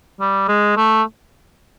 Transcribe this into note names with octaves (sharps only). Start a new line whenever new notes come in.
G3
G#3
A3